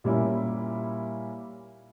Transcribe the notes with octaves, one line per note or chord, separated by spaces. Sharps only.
A#2 G3 A#3 C#4 E4